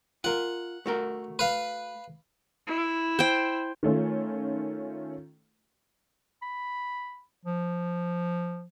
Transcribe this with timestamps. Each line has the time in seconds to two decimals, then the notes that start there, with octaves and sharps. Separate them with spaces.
0.24 F4 A#4 F#5
0.86 A3 F#4 A#4
1.39 B4 F5
2.68 E4
3.19 C5 G5
3.83 D#3 A3 C#4 F4
6.42 B5
7.45 F3